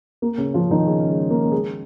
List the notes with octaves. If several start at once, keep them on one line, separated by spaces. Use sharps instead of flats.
A#3
C#3 C#4
F3 F4
D#3 D#4
C#3 C#4
G#3
A#3
G#3 G#4